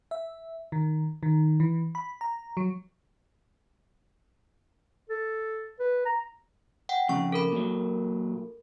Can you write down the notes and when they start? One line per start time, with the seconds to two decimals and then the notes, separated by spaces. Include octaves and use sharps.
0.11 E5
0.72 D#3
1.23 D#3
1.60 E3
1.95 B5
2.21 A#5
2.57 F#3
5.10 A4
5.80 B4
6.06 A#5
6.89 F#5 G5
7.09 F2 C#3 C#6
7.32 A4 A#4 B5
7.52 A#2 F#3